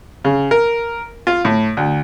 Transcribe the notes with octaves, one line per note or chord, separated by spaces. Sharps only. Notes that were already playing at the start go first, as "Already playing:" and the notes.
C#3
A#4
F4
A2
D2